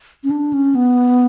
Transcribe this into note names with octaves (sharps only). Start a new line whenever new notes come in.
C#4
D4
C#4
B3